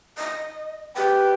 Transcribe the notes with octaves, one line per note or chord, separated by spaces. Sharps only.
D#5
G4 B4